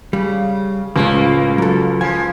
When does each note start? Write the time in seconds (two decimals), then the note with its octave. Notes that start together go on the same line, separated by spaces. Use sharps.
0.13 C#3 G3
0.96 C#2 A2 C#3 F3 A#3
1.58 F#3 A4
2.01 F3 G#5